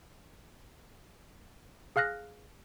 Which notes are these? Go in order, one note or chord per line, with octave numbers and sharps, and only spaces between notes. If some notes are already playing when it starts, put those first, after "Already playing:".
G#4 F5 F6 F#6 A#6